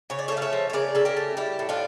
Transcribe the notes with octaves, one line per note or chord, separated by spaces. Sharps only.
C#3 C#5
D5
A3 A4 C#5
F5
C#5 E5
F3
C#5
C#3 A#4 D5
C#3 A4
G4 A#4
A3
G3 E4 G4
A2
D4 F4